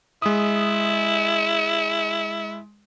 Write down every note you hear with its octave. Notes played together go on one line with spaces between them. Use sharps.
G#3 E4 D#6